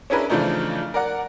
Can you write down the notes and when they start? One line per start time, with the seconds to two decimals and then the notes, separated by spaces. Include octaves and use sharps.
0.10 C#4 D4 E4 G#4 A#4 B4
0.30 C#3 E3 F3 A3 D4 D#4
0.94 A#4 D5 F#5